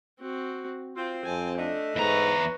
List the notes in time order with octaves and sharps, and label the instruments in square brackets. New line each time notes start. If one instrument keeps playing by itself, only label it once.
[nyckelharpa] C4 F#4
[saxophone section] C4 [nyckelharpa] F4
[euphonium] F2 [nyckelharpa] G#5 A5
[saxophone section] A3 D#5 [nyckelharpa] D4
[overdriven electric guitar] E2 A#5 [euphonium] G#2 [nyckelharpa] B4 C#5